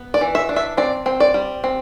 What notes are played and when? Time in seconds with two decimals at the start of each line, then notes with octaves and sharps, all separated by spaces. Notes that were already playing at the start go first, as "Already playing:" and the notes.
Already playing: B3
0.14 D5
0.21 E3
0.35 E5
0.49 D4
0.56 E5
0.77 C4 D5
1.06 C4
1.20 D5
1.34 G3
1.64 C4